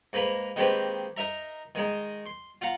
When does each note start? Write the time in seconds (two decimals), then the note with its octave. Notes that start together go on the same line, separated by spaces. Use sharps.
0.13 G#2 A#3 B4 A#5 B5
0.56 D#3 G#3 A#3 C4 G4 B4
1.17 D#4 A#4 E5 A#5
1.75 D#3 G#3 D#4
2.26 C6
2.61 F4 F5 F#5 A#5